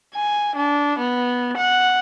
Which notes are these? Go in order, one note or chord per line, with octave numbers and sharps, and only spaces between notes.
G#5
D4
B3
F#5